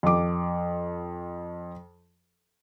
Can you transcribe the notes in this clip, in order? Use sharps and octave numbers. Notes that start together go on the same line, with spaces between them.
F2 D6